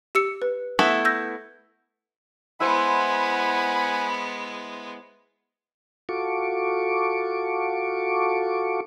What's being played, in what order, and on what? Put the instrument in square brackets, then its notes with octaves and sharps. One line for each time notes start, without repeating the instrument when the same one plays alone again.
[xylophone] G4 E6 C#7
B4
[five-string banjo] A3 B3 E4
[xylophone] E6 G6 A#6
[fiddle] G#3 B3 [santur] E4 C5 [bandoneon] F#5 G#5 [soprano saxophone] B5
[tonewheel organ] F4 F#4 A4 C#6 D6